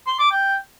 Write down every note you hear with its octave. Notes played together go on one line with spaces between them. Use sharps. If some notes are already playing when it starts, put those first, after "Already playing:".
C6
D6
G5